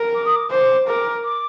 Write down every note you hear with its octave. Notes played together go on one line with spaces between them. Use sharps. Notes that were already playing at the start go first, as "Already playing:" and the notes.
Already playing: A#4
D6
D#6
D6
C5 D6
A#4 D6
D6